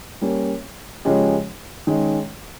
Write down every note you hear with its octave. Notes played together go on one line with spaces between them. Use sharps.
G3 A#3 C#4
C#3 F3 G#3 C#4 G4
D#3 G#3 C#4